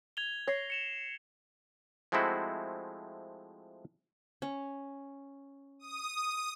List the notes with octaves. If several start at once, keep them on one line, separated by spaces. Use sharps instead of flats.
G#6 F7 G7
C#5 G#6 A#6 C7
C#7 E7 F7
F3 G#3 A3 C4 E4 F#4
C#4
D#6